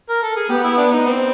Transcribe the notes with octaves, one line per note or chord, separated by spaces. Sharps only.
A#4
A4
G#4
B3 G4
E4
D4
D#4
C4